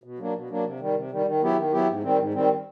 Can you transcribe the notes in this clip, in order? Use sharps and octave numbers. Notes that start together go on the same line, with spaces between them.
B2
F#3 A#3 D4
B2
F#3 A#3 D4
C3
D#3 G3
C3
D#3 G3
D#3
F#3 B3 E4 G4
D#3
F#3 B3 E4 G4
G#2
D#3 G3 C4
G#2
D#3 G3 C4